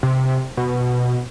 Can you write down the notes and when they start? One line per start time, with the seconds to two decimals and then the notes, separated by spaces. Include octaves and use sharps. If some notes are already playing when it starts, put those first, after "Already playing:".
0.03 C3
0.57 B2